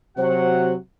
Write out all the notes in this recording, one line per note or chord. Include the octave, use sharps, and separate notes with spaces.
C3 F#3 F#4 C5 F#5